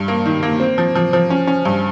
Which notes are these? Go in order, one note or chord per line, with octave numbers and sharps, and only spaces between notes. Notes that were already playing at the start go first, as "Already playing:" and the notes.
Already playing: G2
A#3
D#3
A#3
C4
F3
F3
F3
C#4
C#4
G2